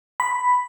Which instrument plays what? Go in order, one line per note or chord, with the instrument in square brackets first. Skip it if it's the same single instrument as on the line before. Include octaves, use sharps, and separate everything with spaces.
[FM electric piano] B5